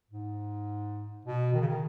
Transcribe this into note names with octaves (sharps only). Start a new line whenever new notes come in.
G#2
B2
D#3
C#3
D#3